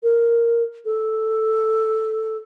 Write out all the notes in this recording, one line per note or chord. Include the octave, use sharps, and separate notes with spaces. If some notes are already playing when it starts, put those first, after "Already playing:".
A#4
A4